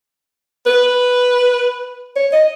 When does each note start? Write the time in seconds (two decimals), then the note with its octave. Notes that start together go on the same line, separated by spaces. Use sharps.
0.66 B4
2.16 C#5
2.32 D#5